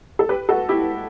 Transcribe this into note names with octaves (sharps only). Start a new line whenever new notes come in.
A4
G4 B4
F#4 A4
E4 G4